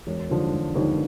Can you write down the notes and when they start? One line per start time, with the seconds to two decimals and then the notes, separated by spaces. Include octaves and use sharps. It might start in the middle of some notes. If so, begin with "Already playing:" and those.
0.07 E1
0.30 D#2 D3 F3
0.52 E1
0.75 D#2 D3 F3